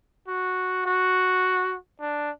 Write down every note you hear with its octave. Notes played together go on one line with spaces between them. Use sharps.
F#4
F#4
D4